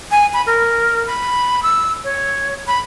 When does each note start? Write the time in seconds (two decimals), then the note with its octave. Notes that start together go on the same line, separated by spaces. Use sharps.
0.11 G#5
0.34 B5
0.47 A#4
1.07 B5
1.63 E6
2.04 C#5
2.67 B5